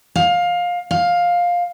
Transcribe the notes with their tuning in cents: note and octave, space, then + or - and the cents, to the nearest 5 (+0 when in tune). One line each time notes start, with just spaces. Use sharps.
F5 +20
F5 +10